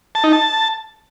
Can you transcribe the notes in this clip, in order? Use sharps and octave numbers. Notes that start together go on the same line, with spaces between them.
A5
D#4
A5